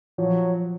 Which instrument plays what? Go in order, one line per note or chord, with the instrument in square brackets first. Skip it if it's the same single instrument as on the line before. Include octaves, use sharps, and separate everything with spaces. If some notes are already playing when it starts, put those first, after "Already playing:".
[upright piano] F3 [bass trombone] F#3